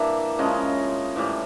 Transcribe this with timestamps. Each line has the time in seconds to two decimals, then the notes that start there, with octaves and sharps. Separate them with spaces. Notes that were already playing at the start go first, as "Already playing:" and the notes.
Already playing: E3 G3 A#3 D4 E5
0.39 C#3 F3 G#3 C#4 D#5
1.16 A2 E3 G3